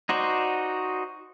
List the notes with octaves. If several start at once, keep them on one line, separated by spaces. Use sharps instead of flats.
D#4 F#4 C5 D5